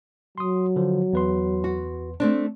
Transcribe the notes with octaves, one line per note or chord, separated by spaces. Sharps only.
F#3 C6 D#6
D3 F3
E2 B4 C6
F#4
A3 C4 D4